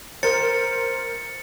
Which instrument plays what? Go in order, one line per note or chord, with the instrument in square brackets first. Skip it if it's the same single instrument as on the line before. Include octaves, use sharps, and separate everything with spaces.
[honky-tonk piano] A#4 C5 [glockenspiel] A6 C#7